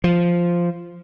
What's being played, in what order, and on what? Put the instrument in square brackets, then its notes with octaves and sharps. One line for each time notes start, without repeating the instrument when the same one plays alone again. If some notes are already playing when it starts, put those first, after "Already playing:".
[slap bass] F3